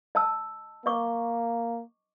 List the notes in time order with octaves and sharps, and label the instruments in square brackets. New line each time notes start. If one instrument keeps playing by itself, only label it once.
[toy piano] D#5 A5 E6
[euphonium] A#3 [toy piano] D#5 C#6 D6